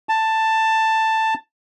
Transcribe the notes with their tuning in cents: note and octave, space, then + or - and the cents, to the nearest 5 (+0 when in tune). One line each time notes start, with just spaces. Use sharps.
A5 +10